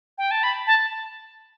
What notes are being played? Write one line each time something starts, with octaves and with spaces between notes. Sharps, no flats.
G5
A5
B5
A5